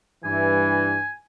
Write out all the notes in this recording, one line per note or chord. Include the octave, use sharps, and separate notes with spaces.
G2 E3 G#5